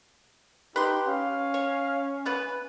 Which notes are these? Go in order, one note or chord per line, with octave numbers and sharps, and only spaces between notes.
D#4 G4 B4 C6
C#4 F5
C#5
E3 B3 B4